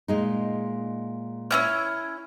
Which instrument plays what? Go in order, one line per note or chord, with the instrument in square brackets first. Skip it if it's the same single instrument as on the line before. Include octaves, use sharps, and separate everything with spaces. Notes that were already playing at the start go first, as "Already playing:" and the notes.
[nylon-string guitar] A#2 G#3 D#4
[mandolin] C#4 E4 F6